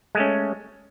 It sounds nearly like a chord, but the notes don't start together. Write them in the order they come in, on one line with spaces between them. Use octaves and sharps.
G#3 A3 C#4